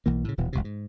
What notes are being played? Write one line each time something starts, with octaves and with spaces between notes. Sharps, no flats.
B1 E3 A#3
A2 C#3
D#1 B2 E3
F1 C#2 C3
G#2